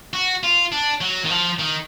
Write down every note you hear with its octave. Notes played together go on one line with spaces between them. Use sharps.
F#4
F4
D4
F#3
D#3
F3
D#3